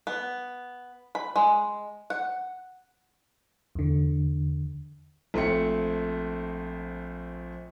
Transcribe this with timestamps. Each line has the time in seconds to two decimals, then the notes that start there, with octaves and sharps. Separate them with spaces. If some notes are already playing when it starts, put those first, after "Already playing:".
0.07 B3
1.15 B5
1.36 G#3
2.10 F#5
3.75 E2 D3
5.34 A#1 A3 C4 C#7